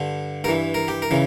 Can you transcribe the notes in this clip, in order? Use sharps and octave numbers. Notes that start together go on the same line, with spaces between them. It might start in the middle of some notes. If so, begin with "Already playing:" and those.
Already playing: G2 D3
G2 E3 A#4
A#4
G4
A#4
C#3 E3